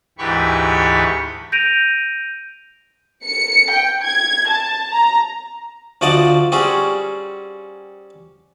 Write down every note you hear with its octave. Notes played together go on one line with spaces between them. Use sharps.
D2 G#2 E3 G4 B5 C#6
G6 A#6 D7 D#7 F7
C#7
G5
G#6
A5
A#5
D2 F3 F#4 D5 D#5 A5
G3 C4 C#4 F#4 G#4